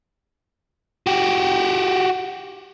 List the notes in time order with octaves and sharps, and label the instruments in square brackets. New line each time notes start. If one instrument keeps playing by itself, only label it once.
[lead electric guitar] F#4 G4